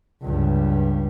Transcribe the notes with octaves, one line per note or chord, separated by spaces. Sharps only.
C#2 G2